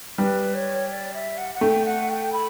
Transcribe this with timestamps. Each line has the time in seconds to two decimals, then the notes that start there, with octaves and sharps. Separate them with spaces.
0.18 G3 B4
0.54 C#5
0.90 D5
1.14 E5
1.38 F#5
1.55 F#5
1.61 A3 G5
1.86 F#5
2.09 G5
2.33 B5